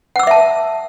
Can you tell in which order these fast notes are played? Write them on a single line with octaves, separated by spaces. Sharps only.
F#5 E6 D6 E5 A5